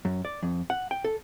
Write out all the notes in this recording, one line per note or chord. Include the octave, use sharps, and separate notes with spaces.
F#2
D5
F2
F#5
G5
A4